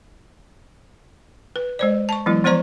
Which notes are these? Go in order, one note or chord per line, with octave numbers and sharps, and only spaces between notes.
B4
G#3 C5 D5
A5 C#6
E3 F#3 G#3 B3 E4
F3 B3 C5 D5 A#5 C#6